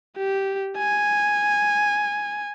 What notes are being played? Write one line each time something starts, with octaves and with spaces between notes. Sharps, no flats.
G4
G#5